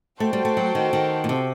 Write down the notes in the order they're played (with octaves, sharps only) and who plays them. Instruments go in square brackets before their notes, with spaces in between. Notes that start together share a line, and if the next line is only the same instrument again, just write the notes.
[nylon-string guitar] A3 [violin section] F#4 A4 C5 G5
[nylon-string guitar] G3
A3
F#3
D#3
D#3
A#2
C3